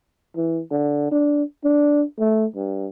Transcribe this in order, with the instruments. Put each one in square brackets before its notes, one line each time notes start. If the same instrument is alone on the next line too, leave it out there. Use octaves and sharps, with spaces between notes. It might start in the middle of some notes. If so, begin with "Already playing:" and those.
[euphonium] E3
D3
D4
D4
A3
G2